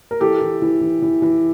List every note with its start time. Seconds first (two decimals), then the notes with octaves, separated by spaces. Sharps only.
0.11 A#4
0.20 E3 G4 A4
0.41 E3
0.62 E3
0.81 E3
1.02 E3
1.22 E3